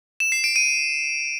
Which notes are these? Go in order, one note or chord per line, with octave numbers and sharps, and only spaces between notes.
E7
C7
D7
D#7